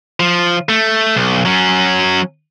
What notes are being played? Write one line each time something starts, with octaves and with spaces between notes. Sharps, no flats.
F3
A3
B1
F#3 C#4